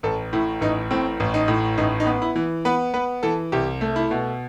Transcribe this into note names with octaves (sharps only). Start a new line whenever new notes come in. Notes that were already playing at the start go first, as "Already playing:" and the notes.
A1 A4
A2 E4
A1 D#4
A2 C4
A1
D#4
A2
A1 D#4
D#4
B3
E4
E3
B3 B4
B3 B4
E3 A4
C2 G4
A3
E4
B2